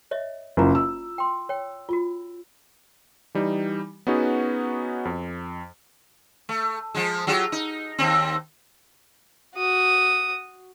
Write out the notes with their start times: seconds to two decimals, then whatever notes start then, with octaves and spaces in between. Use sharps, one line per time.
0.11 C#5 D#5 E5
0.57 F#1 E4 F4 A#5
0.75 E6
1.18 G5 C6
1.49 C#5 G5
1.89 F4 F#4
3.35 E3 G3 D#4
4.07 B3 C#4 D#4 F#4 G#4 B4
5.05 F2
6.49 A3
6.95 F3 G#3
7.27 F#3 F4 G4
7.52 D#4
7.98 D#2 C4
9.55 F#4 D#6